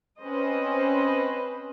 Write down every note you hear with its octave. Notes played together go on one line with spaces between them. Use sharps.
C4 C#4 B4 C5 D#5